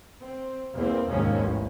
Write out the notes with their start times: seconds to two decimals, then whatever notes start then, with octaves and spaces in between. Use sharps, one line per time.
0.20 C4
0.74 E2 A#3 C4
1.08 F1 D#2 G#2 D#3 F3 C#4
1.38 A1